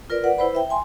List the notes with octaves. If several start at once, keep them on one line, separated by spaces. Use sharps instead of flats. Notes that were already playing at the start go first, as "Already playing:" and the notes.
F4 A#4 B4 D5
B4 D5 F#5
E4 B4 C5 B5
E5 G5
G#5 C6